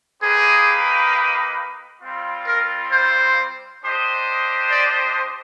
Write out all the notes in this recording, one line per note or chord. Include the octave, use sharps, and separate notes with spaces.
A#3 D#4 G4 G#4 B4
G3 C4 F4
A#4
C5
D4 G4 C5 D#5
D5